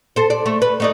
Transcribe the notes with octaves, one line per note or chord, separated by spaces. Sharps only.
A4 C5
D5
A3
B4
A3 D#4 D5